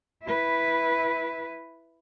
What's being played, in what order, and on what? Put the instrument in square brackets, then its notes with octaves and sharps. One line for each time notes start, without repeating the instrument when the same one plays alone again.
[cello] E4 B4